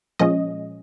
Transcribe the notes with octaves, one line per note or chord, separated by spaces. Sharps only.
A#2 F3 G#3 C#4 D#5